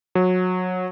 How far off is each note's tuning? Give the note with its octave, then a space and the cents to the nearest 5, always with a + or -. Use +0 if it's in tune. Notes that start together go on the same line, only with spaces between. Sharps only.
F#3 -20